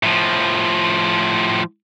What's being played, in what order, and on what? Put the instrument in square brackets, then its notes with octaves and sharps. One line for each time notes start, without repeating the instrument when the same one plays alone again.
[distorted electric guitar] A2 F3